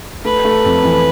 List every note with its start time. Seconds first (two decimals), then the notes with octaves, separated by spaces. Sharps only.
0.24 A3 B4
0.45 A3
0.65 F2
0.84 E3